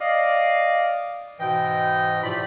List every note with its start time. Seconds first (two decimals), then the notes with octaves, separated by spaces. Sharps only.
0.01 D5 D#5 F5
1.40 G#2 B2 E3 D#5 G5
2.24 A2 C3 F3 F4 D5 B5